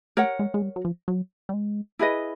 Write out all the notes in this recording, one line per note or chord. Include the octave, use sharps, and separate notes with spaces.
A3 A#4 C#5 F#5
G#3
G#3
G3
F#3
F3
F#3
G3
G#3
E4 G#4 B4 D#5